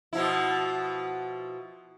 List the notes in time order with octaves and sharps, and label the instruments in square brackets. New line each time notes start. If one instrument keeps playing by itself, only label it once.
[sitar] B2 F3 E4